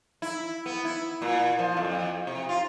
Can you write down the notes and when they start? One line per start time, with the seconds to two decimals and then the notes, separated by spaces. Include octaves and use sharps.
0.22 E4
0.66 B3
0.85 E4
1.22 A#2
1.59 F3
1.77 F2
2.27 C3
2.49 F4